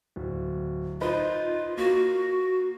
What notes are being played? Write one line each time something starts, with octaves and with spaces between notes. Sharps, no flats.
D1
D#4 F4 B4 C5
A#3 F#4